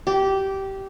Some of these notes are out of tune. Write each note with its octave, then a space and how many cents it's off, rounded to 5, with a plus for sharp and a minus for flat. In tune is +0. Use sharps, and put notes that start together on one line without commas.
G4 -15